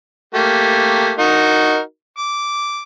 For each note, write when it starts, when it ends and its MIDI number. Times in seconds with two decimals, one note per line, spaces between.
0.35 1.12 57
0.35 1.12 58
0.35 1.12 67
1.19 1.79 63
1.19 1.79 66
1.19 1.79 70
2.18 2.82 86